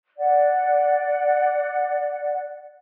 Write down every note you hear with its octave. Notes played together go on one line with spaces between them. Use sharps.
D5 F#5